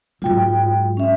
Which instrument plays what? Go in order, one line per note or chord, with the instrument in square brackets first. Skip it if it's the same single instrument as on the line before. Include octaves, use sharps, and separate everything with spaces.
[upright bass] G#2 F#3 [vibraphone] F4 G5
[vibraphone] C#4 E5